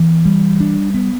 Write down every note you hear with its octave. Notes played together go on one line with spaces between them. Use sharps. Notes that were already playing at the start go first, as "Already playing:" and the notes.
Already playing: E3 B3
G3
D4
B3